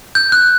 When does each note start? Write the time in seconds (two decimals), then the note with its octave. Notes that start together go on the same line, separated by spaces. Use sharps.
0.15 G6
0.32 F#6